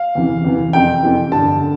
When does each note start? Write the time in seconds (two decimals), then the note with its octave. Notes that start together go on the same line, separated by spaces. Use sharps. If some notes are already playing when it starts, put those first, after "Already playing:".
Already playing: F5
0.15 E2 C3 E3
0.45 E2 C3 E3
0.73 F2 C3 E3 G5
1.03 F2 C3 E3
1.32 G2 D3 A5
1.61 D3